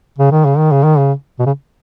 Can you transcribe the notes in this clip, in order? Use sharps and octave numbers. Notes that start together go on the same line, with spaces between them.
C#3
D#3
C#3
D#3
C#3
D#3
C#3
B2
C#3